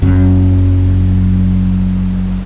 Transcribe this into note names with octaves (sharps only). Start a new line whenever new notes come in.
F#1 F#2 F#3 C#4